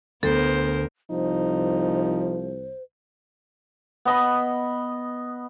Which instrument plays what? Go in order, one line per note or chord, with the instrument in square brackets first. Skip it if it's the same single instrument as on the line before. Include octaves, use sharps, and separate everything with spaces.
[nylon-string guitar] D2 [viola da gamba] B3 A#4 [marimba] A4 [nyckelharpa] C5
[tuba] C2 [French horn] F3 [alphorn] D#4 [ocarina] C5
[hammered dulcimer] B3 D#5 B5